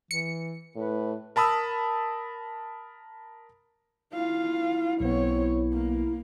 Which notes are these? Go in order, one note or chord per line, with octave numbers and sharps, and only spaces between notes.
E3 C#7
A2 B4
A#4 A5 B5 D#6 E6
E4 F4 F5
B1 B3 C4 C#5
A#3